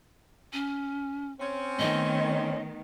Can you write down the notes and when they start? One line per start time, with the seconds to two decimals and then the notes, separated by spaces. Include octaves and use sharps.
0.53 C#4
1.40 C4 C#4
1.79 D#3 A3 B3 D#5